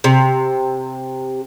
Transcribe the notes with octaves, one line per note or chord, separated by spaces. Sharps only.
C3